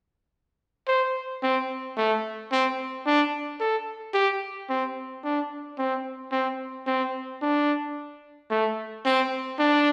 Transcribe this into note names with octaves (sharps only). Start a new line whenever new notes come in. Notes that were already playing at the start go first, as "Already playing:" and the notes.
C5
C4
A3
C4
D4
A4
G4
C4
D4
C4
C4
C4
D4
A3
C4
D4